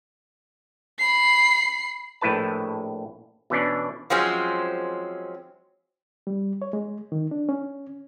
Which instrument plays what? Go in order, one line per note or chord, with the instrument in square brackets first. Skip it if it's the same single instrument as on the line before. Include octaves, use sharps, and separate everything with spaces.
[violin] B5 C7
[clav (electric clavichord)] A#1 A2 E4 B4 A5
B2 E3 C#4 D4
[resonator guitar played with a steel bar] F3 F#3 G#3 C4 C#4
[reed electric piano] G3
C#5
G#3
D#3
D4
C#4